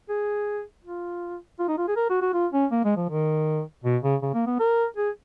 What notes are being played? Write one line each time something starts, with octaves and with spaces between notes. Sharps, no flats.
G#4
F4
F4
D#4
F4
G#4
A#4
F#4
F#4
F4
C#4
A#3
G#3
F3
D#3
B2
C#3
C#3
A#3
B3
A#4
G#4